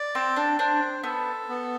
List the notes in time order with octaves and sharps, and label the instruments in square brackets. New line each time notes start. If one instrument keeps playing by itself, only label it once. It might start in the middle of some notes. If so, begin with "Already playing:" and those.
Already playing: [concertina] D5
[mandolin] C4 [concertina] G5
[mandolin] D4
[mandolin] D4 [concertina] C5
[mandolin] B3 [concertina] A4
[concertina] B3